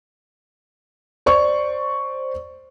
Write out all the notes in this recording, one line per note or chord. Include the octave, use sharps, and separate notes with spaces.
C5 D5 C#6